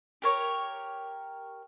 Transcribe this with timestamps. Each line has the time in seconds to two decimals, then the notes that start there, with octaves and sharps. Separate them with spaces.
0.22 G4 A#4 C#5